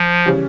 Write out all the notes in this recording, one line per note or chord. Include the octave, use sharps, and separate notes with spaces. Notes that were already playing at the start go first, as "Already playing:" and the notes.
Already playing: F3
C#3 E3 G3 C#4